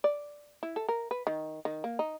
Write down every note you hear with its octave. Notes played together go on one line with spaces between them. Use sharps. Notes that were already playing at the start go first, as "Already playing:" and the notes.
D5
E4
A4
A#4
B4
D#3
D#3
A#3
D#4